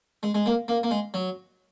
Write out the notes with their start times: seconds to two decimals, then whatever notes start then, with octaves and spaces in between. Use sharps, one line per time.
0.23 G#3
0.35 G#3
0.46 A#3
0.68 A#3
0.83 A#3
0.91 G#3
1.14 F#3